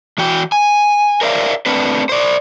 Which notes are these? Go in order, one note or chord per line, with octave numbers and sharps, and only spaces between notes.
E3 F#4 G5
G#5
A#4 C5 D5 E5 F5
A3 C4 D4 B4
C5 D5